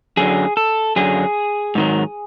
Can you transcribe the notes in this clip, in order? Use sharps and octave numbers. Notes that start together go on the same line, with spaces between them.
F#2 D3 F#3 G#4
A4
F#2 D3 F#3 G#4
G#2 D#3 F#3